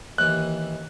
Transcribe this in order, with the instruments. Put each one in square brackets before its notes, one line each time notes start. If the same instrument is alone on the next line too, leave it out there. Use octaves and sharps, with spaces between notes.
[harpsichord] D#2 E3 [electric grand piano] F#6